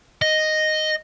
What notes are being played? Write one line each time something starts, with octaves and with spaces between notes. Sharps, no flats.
D#5